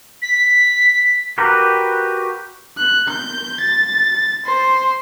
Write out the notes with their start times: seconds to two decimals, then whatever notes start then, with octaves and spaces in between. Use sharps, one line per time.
0.22 B6
1.38 F#4 G4 A#4 B4
2.78 F#6
3.09 G6
3.61 A6
4.46 C5